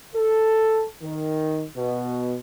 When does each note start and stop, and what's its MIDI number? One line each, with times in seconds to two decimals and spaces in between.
0.16 0.87 69
1.02 1.65 51
1.77 2.36 47